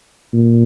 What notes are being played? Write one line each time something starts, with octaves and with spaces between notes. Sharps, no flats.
A#2